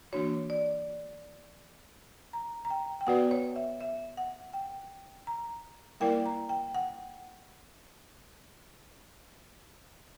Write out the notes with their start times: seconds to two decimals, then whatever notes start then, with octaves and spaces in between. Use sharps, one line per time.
0.13 E3 A#3 D4 F#4 C#5
0.50 D5
2.33 A#5
2.65 A#5
2.70 G5
3.01 G5
3.07 B3 F#4 B4 D5 F#5
3.31 C#5
3.56 E5
3.81 E5
4.17 F#5
4.53 G5
5.27 A#5
6.00 G3 A#3 E4 A#4 D5 G5
6.26 A#5
6.49 G5
6.75 F#5